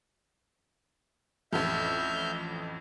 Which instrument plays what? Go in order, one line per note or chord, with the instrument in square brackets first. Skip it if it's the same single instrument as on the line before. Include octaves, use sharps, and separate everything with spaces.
[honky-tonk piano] A1 F2 [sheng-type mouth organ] E5 F6 G6